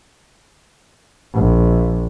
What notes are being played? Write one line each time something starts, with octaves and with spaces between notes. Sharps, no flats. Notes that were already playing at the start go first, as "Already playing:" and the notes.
A#1